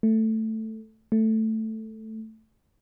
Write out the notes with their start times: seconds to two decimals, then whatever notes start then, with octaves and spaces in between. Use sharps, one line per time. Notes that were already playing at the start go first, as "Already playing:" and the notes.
0.03 A3
1.12 A3